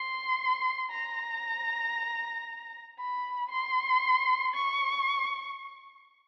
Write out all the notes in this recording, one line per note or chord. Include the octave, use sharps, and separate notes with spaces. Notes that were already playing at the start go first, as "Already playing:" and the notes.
Already playing: C6
A#5
B5
C6
C#6